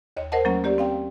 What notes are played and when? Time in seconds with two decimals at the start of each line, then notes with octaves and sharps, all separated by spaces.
0.17 D#2 C#5 D#5
0.32 A#4 C5 D#5 F#5 A5
0.45 F#3 A3 A#3 C#4
0.64 A#3 G4 D5
0.78 C4 F5 G5